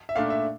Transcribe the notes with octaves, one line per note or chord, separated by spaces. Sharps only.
E5
A#2 A3 D4 F5
E5